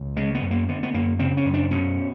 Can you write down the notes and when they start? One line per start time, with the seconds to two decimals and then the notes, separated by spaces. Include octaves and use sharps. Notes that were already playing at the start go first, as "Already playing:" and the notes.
Already playing: C#2
0.17 C#3 G#3
0.35 B3
0.42 F#2
0.51 A#3
0.68 D3 B3
0.83 B3
0.93 F#2 A#3
1.19 C#3 C4
1.37 C#4
1.46 F#2
1.54 D4
1.71 B2 C#4